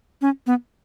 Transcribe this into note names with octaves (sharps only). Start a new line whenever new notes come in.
C#4
B3